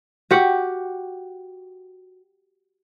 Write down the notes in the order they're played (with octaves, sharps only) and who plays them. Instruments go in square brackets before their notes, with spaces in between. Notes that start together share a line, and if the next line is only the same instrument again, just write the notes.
[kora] F#4 G4 F#5